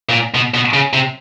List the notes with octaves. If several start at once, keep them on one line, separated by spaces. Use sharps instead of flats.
A#2
B2
B2
C#3
C3